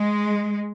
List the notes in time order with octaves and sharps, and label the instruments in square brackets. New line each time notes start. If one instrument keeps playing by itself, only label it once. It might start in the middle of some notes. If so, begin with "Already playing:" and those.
Already playing: [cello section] G#3